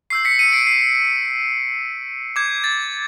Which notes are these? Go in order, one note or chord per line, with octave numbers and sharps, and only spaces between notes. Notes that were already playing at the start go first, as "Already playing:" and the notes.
C#6 E6 G6 C7
B6 C#7
C#7 D#7
C7 D7
C7
D6 G6 G#6
A6